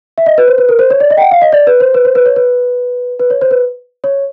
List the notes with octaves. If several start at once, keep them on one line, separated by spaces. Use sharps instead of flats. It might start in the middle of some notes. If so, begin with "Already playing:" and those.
E5
D#5
B4
C5
B4
A#4
C5
C#5
D5
D#5
G5
F#5
F5
D#5
D5
B4
C5
B4
C5
B4
C#5
B4
B4
C#5
C5
B4
C#5